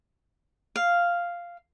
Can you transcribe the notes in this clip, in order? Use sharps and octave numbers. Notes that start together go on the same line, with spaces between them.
F5